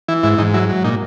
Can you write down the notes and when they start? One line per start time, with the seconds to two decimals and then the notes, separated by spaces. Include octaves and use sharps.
0.09 E3 E4
0.23 G#2 E4
0.38 G#2 D#4
0.54 F#3 E4
0.69 F#3
0.84 A#2 D#4